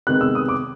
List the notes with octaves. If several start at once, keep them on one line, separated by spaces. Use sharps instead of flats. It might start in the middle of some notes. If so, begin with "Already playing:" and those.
C3 D#3 G#3 B3 F#6
E6
D#6
D6